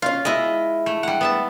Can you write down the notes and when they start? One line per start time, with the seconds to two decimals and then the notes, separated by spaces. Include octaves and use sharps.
0.02 C#4 F4 F5
0.25 G#3 E4 D#5
0.86 A3
1.03 G3 F#5
1.21 B3 E5 A5